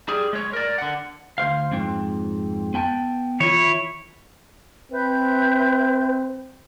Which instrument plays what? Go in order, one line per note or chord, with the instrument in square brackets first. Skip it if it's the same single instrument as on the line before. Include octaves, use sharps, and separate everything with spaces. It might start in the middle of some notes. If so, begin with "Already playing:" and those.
[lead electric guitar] G3 G#4
G#3 C#5
A#4 D5
D3 F#5
[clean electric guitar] D2 C5 F5
F2 G#2 C4
B3 G5 A5
[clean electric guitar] E3 F4 [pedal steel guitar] E4 C#5
[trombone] C4 [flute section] B4 E5 G6